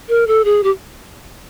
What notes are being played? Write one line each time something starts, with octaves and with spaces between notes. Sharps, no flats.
A#4
A4
G#4
G4